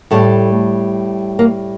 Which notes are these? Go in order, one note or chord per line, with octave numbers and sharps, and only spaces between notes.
A2 G3 A3
A#3